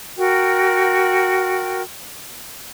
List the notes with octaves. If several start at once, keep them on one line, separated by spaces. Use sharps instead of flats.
F#4 A#4 G5